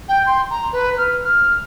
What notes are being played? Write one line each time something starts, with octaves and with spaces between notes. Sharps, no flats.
G5
C6
A#5
B4
F6
F6